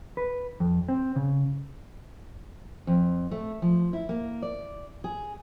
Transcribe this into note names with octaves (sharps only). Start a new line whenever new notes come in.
B4
F2
C4
C#3
F2
A3
F3
E4
A#3
D5
G#4